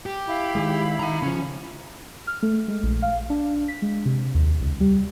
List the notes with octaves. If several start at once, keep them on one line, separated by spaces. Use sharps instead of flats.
G4
E4 F5 B5
D#3 E3 G#3
D#3 E5 A#5
C#3 F3 C#4
F6
A3
G#3
A#1
F5
D4
B6
G#3
C3
D#2
C#2
G3